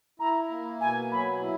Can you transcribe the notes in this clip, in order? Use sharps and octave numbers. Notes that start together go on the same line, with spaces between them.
E4 A#5
A#3
B2 G#5
F#3 B5
E4